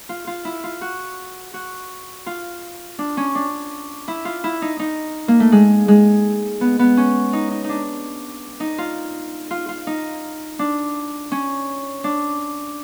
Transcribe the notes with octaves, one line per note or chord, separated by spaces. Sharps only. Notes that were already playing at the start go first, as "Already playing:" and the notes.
F4
F4
E4
F4
F#4
F#4
F4
D4
C#4
D4
E4
F4
E4
D#4
D#4
A#3
A3
G#3
G#3
B3
B3
C#4
D#4
D#4
D4 D#4
D#4
F4
F4
F4
D#4
D4
C#4
D4